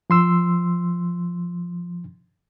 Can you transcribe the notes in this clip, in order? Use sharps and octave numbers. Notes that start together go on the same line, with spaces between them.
F3 C6 E6